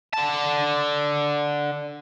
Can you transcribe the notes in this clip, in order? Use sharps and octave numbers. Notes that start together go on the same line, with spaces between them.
D3 A5